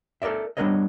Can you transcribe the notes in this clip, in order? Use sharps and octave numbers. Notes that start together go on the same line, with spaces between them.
A4 A#4 C#5 D5 E5
G3 B3 D4 A#4 C#5 D#5